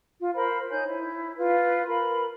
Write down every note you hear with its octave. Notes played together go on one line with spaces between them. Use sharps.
F4
A#4 C5 B5
D#4 C#5 G#5 G6
E4
F4 B4
A#4 B5